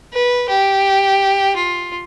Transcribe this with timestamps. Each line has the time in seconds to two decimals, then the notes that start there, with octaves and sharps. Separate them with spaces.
0.13 B4
0.49 G4
1.56 F4